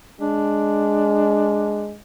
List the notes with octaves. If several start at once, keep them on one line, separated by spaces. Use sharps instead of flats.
G#3 D4